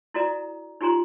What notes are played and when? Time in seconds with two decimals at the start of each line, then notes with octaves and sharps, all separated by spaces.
0.14 E4 F#4 A4 D5 A#5
0.81 D#4 F4 G4 G#5 A#5 C6